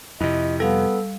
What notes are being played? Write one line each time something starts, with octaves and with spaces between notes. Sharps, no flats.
F2 C3 E4 D#5
G3 B3 A4 F5